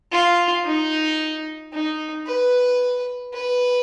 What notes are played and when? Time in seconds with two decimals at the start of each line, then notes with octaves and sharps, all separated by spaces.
0.12 F4
0.65 D#4
1.73 D#4
2.27 B4
3.34 B4